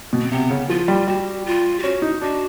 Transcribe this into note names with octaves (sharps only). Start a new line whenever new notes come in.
B2
C4
C3 B3
C#3
F3 F4
G3
G3 F#4
F4
G4
C#4 F#4
D#4
D4 F#4